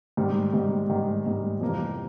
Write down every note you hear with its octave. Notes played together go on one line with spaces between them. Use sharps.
G#2 D#3 G3
G#2 D#3 G3
G#2 D#3 G3
G#2 D#3 G3
F2 C3 E3 G3 A#3